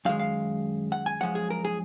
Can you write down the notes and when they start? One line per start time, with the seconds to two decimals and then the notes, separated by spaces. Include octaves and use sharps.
0.05 F#2 D#3 G#3 F5
0.20 F5
0.92 F#5
1.06 G#5
1.20 F#2 F3 G#3 F#5
1.35 G#4
1.50 A#4
1.65 G#4